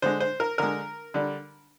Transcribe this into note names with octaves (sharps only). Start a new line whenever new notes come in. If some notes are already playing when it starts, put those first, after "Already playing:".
D3 G#3 C5
C5
A#4
D3 G#3 A#4
D3 G3